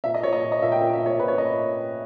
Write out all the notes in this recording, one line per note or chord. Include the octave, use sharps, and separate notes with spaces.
A#2 E5
D#5
A#2 C#5
D#5
A#2
D#5
A#2 E5
G5
A#2 E5
E5
A#2
C#5
A#2 B4
C#5
A#2 D#5